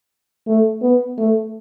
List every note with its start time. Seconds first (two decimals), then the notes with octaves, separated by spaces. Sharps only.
0.47 A3
0.82 B3
1.18 A3